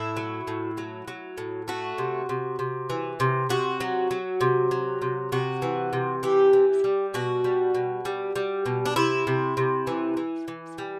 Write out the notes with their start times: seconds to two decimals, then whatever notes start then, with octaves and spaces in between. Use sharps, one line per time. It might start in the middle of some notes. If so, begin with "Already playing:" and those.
Already playing: A2 E4
0.17 F#3
0.48 A2
0.78 F#3
1.08 F#3
1.38 A2
1.68 A3 F#4
1.98 C3
2.29 C3
2.59 C3
2.90 E3
3.20 C3
3.49 C3 F#4
3.80 F#3
4.11 F#3
4.41 C3
4.71 F#3
5.02 C3
5.32 C3 F#4
5.62 E3
5.93 C3
6.23 E3 G4
6.53 E3
6.84 G3
7.14 B2 F#4
7.44 G3
7.75 B2
8.05 G3
8.36 G3
8.66 B2
8.86 D4
8.96 C3 E4
9.27 C3
9.57 C3
9.87 E3
10.17 E3
10.48 E3
10.78 G3